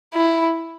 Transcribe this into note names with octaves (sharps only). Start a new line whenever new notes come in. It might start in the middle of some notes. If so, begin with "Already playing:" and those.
E4